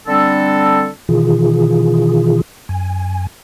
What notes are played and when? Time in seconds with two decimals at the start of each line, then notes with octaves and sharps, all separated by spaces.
0.06 D3 G3 C4 D4 A4
1.09 B2 D#3 E3 F4 G#4
2.69 F#2 G#5